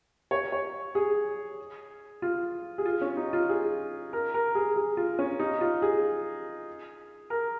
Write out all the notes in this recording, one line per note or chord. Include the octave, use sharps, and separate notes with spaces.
C#5
C#5
G#4
F4
G#4
F4
C#4
D#4
F4
G#4
A#4
A#4
G#4
G#4
F4
C#4
D#4
F4
G#4
A#4